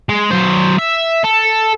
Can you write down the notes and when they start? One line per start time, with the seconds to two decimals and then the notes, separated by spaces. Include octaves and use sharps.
0.09 G#3
0.31 F#3 C5
0.79 E5
1.24 A4